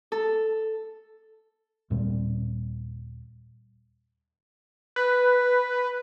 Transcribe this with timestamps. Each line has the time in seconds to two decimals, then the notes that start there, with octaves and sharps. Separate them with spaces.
0.12 A4
1.90 D#2 A#2 G3 C4
4.96 B4